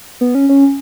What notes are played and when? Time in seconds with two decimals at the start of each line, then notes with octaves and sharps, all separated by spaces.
0.21 B3
0.35 C#4
0.49 C#4